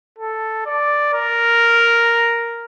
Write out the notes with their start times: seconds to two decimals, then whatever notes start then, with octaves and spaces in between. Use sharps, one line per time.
0.18 A4
0.66 D5
1.14 A#4